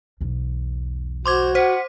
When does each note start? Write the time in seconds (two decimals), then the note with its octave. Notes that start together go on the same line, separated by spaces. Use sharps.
0.21 B1 E2
1.26 F#4 C5 C6 D6 G#6
1.55 C5 F#5 B6